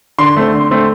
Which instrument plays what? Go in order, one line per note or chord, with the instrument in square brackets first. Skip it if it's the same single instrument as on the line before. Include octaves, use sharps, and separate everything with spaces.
[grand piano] D3 C6
A3 C4
D3
A3 C4